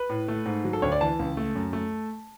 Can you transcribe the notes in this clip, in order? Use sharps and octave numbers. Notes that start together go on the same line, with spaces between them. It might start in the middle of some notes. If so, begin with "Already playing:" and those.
Already playing: B4
A2
A3
G#2
F#3
A4
D2 C#5
D5
E3 A5
C#2
A3
F#2
A3